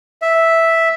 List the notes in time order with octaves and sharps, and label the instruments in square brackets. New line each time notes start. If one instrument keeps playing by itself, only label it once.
[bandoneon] E5